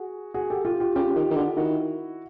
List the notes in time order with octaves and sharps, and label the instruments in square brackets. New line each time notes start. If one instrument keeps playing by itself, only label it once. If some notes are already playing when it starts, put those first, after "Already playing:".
Already playing: [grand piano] F#4 G#4
F#4 G#4
G4 A4
F4 G4
F4 G4
[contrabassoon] C#3 [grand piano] F4 G4
[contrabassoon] D#3
D#3
D3
[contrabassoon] D#3 [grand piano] E4 F#4